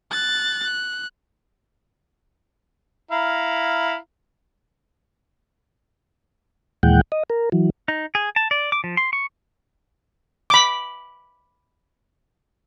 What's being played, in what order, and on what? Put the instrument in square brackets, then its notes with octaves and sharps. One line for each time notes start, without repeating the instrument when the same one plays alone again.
[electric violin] F#6 A6
F#6
[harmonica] E4 F5 A#5
[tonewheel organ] D#2 A#2 E3 G#3 F#5 G5
D#5
A#4
E3 F#3
[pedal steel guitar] D#4
G#4
A5
D5
D6
F3
C6
C#6
[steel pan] B5 D6